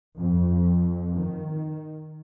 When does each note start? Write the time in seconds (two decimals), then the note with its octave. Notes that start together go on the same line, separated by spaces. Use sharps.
0.18 F2
1.16 D#3